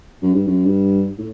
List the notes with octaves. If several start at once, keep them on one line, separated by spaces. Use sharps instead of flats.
F#2
G2
F#2
G2
A2